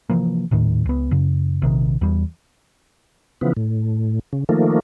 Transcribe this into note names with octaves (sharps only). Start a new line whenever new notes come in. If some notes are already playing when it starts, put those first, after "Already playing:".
C3 E3 F3 A#3
D#1 A2 D#3
C#2 B3
F#2 C#3
A#1 C3 D#3
E2 G3
C#3 E3 F3 B3
A2
C#3
D#3 F3 A3 A#3